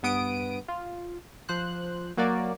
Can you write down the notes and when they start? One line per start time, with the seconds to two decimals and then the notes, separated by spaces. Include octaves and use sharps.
0.03 G2 B3 D#6 D7
0.68 F4
1.49 F3 C5 F#6
2.17 F#3 A#3 F#4 D5